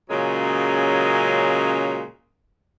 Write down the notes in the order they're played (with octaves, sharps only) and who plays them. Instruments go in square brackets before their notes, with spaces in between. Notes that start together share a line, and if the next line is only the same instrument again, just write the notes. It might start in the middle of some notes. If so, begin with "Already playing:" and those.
[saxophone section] A#2 C#3 F#3 G#3 C#4